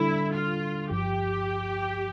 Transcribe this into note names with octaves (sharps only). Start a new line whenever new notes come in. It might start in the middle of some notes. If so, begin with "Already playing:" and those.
Already playing: D3 G3 D4 E4 A4
F4
G1 G2 F3 G4